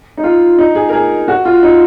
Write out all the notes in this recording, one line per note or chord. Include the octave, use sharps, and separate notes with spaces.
D#4
F4
D#4
G#4
A#4
G#4
F#4
F4
D#4